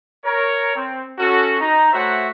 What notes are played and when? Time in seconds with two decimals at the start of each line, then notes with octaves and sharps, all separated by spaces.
0.24 A#4 C#5
0.75 C4
1.19 C#4 F#4 A4
1.61 D#4 A#5
1.93 A3 F#4 C5 C#5 E5 F#5